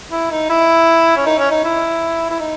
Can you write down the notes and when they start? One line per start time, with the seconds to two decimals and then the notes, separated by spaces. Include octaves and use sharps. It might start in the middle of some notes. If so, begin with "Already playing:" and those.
0.11 E4
0.31 D#4
0.50 E4
1.17 C#4
1.26 D#4
1.39 C#4
1.51 D#4
1.64 E4
2.30 E4
2.40 D#4